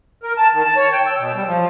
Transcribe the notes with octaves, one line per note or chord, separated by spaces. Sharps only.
A#4
A5
D#3
A5
C#5
G5
E6
B2
G3
F3